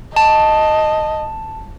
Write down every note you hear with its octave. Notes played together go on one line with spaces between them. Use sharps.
D#5 A5